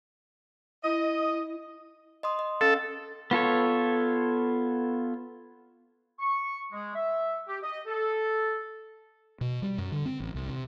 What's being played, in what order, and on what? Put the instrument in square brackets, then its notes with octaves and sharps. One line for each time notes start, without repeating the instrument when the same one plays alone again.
[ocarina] E4 [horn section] D#5
[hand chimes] D#5 C6 D#6
D#5
[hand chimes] C#4 F5 [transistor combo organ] A4
[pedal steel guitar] B3 F4 A4 C#5
[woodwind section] C#6
G#3
E5
G4
D#5
A4
[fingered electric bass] B2
G3
F#2
D3
C4
A1
C2
C3